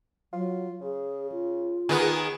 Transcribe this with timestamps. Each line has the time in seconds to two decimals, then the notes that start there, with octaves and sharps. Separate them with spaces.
0.33 F#3 F4
0.81 C#3 G#4
1.32 F4
1.89 D#2 D#3 B3 G#4